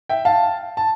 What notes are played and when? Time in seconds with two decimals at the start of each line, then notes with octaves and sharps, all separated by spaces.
0.09 E5 G5
0.25 F5 A5
0.77 A5